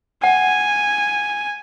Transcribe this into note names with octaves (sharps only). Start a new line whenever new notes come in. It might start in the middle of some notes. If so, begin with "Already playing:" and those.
F#5 G#5